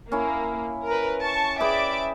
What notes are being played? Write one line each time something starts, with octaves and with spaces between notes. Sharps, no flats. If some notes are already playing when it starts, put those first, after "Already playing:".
A#3 C#4 E4
A#4 B4
A5 C#6
G#4 B4 D5 E5 G5 D6